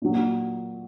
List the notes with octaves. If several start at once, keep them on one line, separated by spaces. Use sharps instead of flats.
A#2 F#3